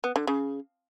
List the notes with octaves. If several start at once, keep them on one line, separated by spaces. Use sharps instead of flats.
B3
D3
C#3